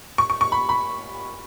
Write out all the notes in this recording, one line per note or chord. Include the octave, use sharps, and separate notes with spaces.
C#6
C#6
C#6
B5
B5